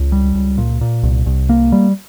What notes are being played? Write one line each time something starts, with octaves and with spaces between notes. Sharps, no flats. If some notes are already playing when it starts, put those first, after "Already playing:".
Already playing: C#2
G3
C#2
A#2
A#2
C2
C2
A#3
G3